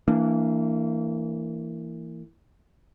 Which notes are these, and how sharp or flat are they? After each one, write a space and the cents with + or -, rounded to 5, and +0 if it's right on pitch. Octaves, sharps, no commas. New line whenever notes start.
E3 +0 A#3 -30 D4 +0